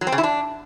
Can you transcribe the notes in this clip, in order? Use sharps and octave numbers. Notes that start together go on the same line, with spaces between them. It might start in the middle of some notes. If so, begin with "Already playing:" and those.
F#3
C4
C#3
E4
D4